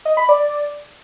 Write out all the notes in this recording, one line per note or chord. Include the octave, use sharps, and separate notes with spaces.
D#5
B5
D5